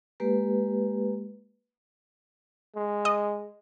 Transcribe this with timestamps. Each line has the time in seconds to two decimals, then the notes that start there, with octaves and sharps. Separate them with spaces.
0.20 G#3 A#3 G4 B4
2.76 G#3
3.05 D#5